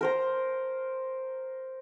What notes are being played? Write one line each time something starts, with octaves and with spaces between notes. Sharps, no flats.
A#4 C5 A#5